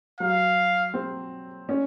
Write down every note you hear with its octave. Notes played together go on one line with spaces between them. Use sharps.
F#3 F5
C4
C#4